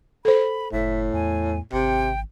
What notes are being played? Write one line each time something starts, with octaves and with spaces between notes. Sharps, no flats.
A4 C5 B5
F#1 A2 E5
E2 G#5
G#1 C3 G5